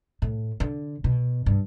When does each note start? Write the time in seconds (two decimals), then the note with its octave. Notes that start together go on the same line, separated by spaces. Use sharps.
0.22 A2
0.60 D3
1.04 B2
1.46 G2